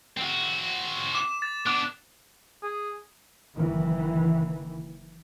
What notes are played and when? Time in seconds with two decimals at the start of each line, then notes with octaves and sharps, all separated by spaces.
0.17 C4 F#4
1.15 D6 E7
1.42 A6
1.66 B3 D4 D6 F#6 D7
2.63 G#4
3.56 F#1 D#3 E3